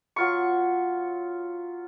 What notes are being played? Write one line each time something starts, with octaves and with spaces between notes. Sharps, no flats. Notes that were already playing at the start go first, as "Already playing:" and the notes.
F#3 F4 C#6